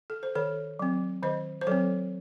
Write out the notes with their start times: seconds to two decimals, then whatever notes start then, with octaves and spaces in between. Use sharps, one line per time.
0.10 A4
0.23 C5
0.35 D#3 A4 C#5
0.79 F#3 C4
1.23 D#3 C5 D#5
1.61 C5
1.67 F#3 C4 A4 C#5